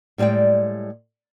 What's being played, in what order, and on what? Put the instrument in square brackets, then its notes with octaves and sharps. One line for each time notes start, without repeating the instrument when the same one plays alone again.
[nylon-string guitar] A2 G3 G#3 D5 G5